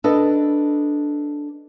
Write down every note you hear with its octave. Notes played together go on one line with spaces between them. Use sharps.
D4 A4 B4 D#5